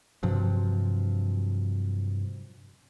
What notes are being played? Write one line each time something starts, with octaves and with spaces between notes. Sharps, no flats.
G2 C3 F3 F#3